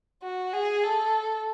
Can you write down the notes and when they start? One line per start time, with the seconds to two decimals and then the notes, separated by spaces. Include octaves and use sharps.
0.23 F#4
0.53 G#4
0.84 A4